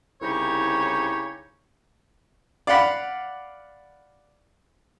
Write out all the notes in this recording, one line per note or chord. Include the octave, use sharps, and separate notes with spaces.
C2 C#3 D#4 E4 G4 C#5
D5 F5 F#5 B5